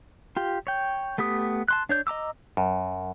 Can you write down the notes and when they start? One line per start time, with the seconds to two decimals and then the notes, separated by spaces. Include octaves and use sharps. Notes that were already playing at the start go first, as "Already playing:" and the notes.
0.37 F4 G4
0.67 C#5 G5
1.18 A3 B3 G4 D#6
1.68 A5 C6 F#6
1.89 D4 C#5 G6
2.07 D#5 A#5 D6 E6
2.57 F#2